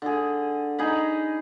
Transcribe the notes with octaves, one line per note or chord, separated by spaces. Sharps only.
D3 G#4
D#4 G#4 A#5 B5